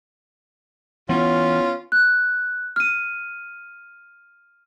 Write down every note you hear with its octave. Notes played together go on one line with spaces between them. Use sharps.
E3 B3 C#4 F4
F#6
F6 D#7